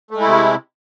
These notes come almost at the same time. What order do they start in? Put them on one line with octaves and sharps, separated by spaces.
A3 G#3 E4 C3